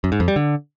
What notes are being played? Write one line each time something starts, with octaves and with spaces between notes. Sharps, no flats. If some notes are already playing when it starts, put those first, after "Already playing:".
F#2
G#2
F2
G3
D3